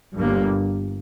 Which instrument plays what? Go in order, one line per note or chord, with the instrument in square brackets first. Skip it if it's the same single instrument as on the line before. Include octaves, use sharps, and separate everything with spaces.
[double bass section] G1 G2 A#3